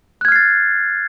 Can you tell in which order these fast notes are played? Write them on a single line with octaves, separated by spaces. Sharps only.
F#6 G#6 F6 C7 A6